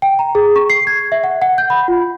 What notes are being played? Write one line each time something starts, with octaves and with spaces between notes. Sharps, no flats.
G5
A#5
G#4
C#6
C7
G#6
E5
F#5
F#5
G6
B5
F4